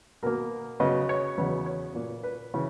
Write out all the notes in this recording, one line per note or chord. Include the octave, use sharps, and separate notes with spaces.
B2 A#3 A#4
C#3 F#3 B3 D#5
C#5
E2 C#3 F#3 B3
C#5
A#2 A#3
B4
C#3 E3